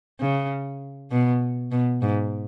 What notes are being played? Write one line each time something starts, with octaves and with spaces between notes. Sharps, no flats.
C#3
B2
B2
G#2